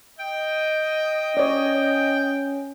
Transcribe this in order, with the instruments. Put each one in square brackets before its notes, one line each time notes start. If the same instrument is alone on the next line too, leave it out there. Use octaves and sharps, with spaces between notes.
[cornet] D#5 [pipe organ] G5
[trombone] C#4 [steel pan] C#5 D5